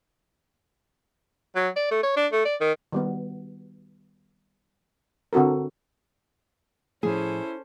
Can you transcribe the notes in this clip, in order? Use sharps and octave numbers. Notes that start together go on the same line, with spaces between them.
F#3
D5
A3
C#5
D4
A3
D5
D#3
D#3 G3 B3
D3 C4 F#4 A4 A#4
A2 F3 A3 C#4 E4 G#4 A4 C5